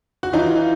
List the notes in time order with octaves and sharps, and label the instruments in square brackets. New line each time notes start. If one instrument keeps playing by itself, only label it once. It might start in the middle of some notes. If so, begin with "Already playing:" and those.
[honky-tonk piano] F#4
[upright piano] E3 [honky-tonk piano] D#4 F4